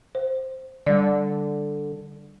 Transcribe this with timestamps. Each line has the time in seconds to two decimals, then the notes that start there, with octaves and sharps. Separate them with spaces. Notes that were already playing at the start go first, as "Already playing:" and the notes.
0.15 C5
0.86 D3 G3 D5